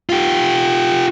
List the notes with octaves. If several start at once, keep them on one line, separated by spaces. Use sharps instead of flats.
F4 G4